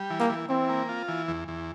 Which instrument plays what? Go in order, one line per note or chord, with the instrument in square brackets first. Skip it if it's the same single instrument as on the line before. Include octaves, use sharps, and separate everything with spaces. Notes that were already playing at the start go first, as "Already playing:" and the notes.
Already playing: [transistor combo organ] G3
E3
[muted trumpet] A#3
[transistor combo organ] E3
[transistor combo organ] E3 [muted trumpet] C4
[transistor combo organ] A#3
F4
E3
E2
E2